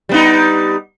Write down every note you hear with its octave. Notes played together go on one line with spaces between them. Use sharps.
G3 B3 D#4